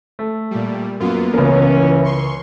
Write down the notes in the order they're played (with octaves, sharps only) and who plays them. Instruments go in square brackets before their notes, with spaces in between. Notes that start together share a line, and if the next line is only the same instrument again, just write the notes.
[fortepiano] A3
[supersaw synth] A#2 G3
[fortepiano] F#2 [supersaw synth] A#3 B3 F4
[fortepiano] C#2 A#4 [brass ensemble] E3 C#4
[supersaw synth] C6 C#6